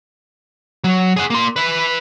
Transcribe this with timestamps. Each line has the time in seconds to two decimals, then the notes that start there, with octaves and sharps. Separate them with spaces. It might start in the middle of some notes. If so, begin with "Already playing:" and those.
0.84 F#3
1.17 G#4 F#5
1.30 A#3 C6
1.56 B4 E5